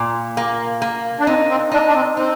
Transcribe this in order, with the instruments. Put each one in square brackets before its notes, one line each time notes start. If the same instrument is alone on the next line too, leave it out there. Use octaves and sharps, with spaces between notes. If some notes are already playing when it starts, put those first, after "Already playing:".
Already playing: [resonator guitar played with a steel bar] A#2
A#3
A#3
[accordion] D4
[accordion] C4 [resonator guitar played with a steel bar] D#4
[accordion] C4
[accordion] D4 [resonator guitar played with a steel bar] D#4
[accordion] D4
C4
[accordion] C4 [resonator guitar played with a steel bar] D#4